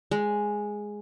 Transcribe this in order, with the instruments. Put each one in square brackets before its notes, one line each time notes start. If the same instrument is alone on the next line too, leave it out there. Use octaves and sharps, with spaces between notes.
[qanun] G#3